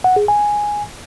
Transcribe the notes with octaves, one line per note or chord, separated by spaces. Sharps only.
F#5
G#4
G#5